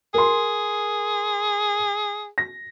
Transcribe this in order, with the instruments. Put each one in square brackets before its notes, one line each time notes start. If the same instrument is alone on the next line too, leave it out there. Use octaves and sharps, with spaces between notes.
[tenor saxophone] G#4 [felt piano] A#4 C6
[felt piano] A#6